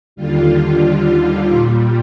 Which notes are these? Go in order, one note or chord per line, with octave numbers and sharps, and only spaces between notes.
D#2 D3 G3 F4
A#2 G3